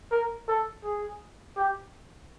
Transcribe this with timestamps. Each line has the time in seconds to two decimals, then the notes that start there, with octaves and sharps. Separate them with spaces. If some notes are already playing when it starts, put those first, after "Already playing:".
0.11 A#4
0.48 A4
0.84 G#4
1.57 G4